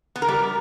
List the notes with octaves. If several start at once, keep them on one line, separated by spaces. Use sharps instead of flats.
B3
A#4
G3